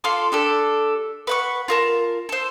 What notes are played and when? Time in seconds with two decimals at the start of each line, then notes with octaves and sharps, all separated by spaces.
0.04 F4 A4 C6 D6
0.32 D4 G4 A4
1.27 B4 F#5 C#6
1.68 F4 A#4 A5
2.29 A4 C5